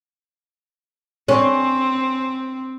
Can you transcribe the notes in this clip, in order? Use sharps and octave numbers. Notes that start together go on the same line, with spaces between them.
C4 C#4